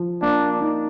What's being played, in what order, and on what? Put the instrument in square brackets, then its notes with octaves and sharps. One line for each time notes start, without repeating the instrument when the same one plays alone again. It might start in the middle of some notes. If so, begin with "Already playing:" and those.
Already playing: [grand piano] F3
[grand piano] A#3 [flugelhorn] D4
[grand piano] D#4